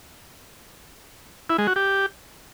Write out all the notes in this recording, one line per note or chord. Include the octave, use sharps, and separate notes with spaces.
E4
G#3
F#4
G4